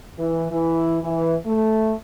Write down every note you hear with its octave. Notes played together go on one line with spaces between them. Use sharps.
E3
E3
E3
A3